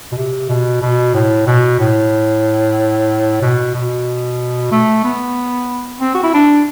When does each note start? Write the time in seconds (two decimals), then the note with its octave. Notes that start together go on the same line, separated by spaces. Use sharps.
0.12 B2
0.17 C3
0.49 B2
0.82 B2
1.14 A2
1.46 B2
1.79 A2
3.42 B2
3.74 B2
4.71 A3
5.04 B3
6.00 C4
6.14 F#4
6.23 E4
6.34 D4